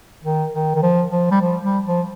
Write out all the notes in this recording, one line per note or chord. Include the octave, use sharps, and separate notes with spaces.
D#3
D#3
D#3
F3
F3
G3
F3
G3
F3